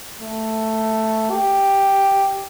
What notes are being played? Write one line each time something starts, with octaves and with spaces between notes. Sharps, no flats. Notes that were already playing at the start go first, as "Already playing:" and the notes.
A3
G4